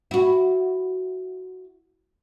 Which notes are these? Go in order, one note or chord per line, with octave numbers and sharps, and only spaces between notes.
E4 F#4